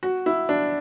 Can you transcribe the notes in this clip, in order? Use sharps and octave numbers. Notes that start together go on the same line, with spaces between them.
F#4
E4
D4